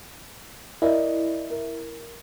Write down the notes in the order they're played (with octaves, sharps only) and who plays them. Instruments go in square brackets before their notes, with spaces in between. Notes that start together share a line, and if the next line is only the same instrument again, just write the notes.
[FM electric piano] E4 [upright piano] A#4 D5 D#5
[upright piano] A#4